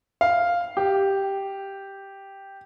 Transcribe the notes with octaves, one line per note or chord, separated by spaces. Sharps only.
F5
G4